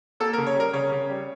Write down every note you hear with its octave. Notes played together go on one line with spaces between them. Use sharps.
A#3 A4
A#4
C#3
C#5
G3 A#4
C#3 C#5
C#3
G3